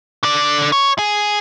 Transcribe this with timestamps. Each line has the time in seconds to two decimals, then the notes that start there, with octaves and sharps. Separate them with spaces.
0.23 D3 D5
0.72 C#5
0.99 G#4